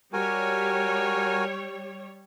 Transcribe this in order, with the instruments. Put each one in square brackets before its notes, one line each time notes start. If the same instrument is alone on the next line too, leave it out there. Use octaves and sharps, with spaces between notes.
[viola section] G3 C#5 [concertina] F#4 A#4 G#5